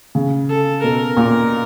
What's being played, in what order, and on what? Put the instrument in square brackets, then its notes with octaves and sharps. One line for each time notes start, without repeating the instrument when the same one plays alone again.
[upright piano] C#3
[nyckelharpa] A4
[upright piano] B2 [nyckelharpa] A#4
[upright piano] A#2